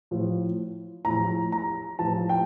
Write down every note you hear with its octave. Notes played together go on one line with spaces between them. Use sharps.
A2 F3
A2 F3 A#5
A#5
A2 F3 A5
G5